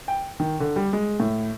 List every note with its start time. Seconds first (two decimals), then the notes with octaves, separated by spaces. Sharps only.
0.08 G5
0.40 D#3
0.60 D3
0.76 G3
0.93 G#3
1.20 A2